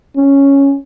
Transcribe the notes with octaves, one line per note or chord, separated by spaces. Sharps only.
C#4